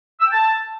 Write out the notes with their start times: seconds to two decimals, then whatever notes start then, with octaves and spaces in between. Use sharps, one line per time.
0.20 E6
0.26 G5
0.32 A5